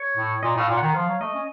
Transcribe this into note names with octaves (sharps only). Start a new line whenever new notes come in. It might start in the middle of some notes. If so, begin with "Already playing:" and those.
Already playing: C#5
A2
A#2 D#5
A2 F5
A#2
D#3 F#5
F3 F5
F#3
A3 D#5
C#4